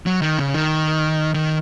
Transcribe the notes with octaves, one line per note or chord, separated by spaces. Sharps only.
F#3
D#3
C#3
D#3
D#3